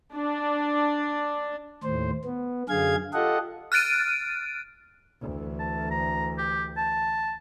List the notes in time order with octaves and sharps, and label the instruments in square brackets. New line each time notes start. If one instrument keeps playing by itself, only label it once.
[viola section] D4
[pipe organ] D#2 A2 C5
B3
F#2 D3 G#4 F5 G#6
F4 G4 A4 D#5 F#5
[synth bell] F6 F#6 A6 D7 D#7
[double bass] D2 E3
[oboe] A5
A#5
G4
A5